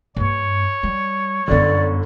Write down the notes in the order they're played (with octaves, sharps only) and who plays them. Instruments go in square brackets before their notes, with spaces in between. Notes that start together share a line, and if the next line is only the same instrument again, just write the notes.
[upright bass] G2 A#3 [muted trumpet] C#5
[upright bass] G3
[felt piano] G1 D3 [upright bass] F#2 B3 [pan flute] D5